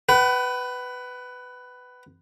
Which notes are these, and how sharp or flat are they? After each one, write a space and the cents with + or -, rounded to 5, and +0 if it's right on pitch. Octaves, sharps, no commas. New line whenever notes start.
B4 +10 F#5 +45